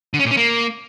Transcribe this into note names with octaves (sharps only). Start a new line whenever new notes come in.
D3
C#4
A#2
C#4
A#3